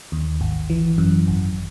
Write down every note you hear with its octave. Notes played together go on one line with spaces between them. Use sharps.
D#2
G#1
E3
F#2
G#1